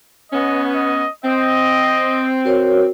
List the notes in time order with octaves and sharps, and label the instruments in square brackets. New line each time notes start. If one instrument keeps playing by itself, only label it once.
[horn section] B3 C#4 [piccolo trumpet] D#5
[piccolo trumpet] D#5
[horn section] C4 [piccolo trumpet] D#5
[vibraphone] F#4 A#4 C#5